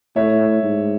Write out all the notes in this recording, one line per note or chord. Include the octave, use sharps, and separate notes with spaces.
A2 C#5 E5
G#2